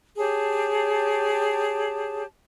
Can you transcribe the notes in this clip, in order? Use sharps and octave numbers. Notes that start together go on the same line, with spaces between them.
G4 G#4 C#5 A5